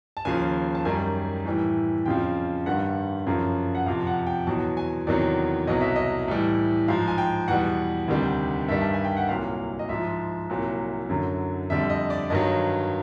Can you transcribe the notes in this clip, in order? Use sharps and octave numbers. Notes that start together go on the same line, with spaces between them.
A5
D#2 C#3 F3 G#5
A5
F#2 D#3 G3 G#5
A2 E3 G3
F2 C#3 F3 G5
G2 D#3 G3 F#5
F#2 C#3 F3
F#5
F2 C3 F3 F5
F#5
G5
E2 B2 F#3 A5
G#5
E2 C3 D#3 F#3 D5
C2 B2 F#3 D#5
E5
D#5
A2 E3 G3
G#2 F3 F5
G#5
G5
E2 B2 G3 F#5
D2 C3 D#3 G3
G2 D#3 G3 E5
A5
G#5
G5
F#5
C2 A#2 F#3 F5
D#5
G#2 F3 E5
C2 A#2 F#3
F#2 D3 F#3
F2 D3 G3 E5
D#5
D5
G2 D#3 F#3 D#5